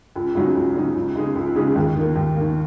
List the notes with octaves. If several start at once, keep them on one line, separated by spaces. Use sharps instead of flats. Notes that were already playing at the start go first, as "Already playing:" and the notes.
C#2
C#3 F#3 D#4
C#2
C#3 F#3 D#4
C#2
C#3 G#3 D#4 G#4
C#2
C#3 G#3 D#4 G#4
D#2
D#3 A#3
D#2
D#3 A#3